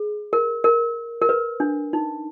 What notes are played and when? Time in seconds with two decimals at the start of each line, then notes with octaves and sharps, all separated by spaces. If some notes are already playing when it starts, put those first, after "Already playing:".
Already playing: G#4
0.33 A#4
0.64 A#4
1.22 A#4
1.29 B4
1.60 D4
1.93 D#4